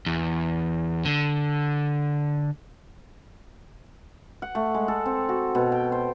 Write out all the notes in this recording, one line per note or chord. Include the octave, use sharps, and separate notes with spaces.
E2
D3
F#5
A3
G#3
A4
C4
F#4
B2
G5
C5